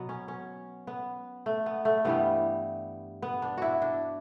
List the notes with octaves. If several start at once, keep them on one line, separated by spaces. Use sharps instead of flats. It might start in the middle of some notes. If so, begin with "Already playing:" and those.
Already playing: B2 F#3 B3
C#4
C#4
B3
A3
B3
A3
G2 E3 G3 B3
B3
D4
E4 F#4
D4